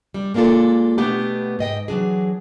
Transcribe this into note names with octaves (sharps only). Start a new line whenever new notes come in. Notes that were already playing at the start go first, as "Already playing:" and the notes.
G3 D4
G#3 A#3 D4 F4 A4
B2 A3 B3 D4 G4 B4
G#2 D#5 G5
E3 F#3 D4 G#4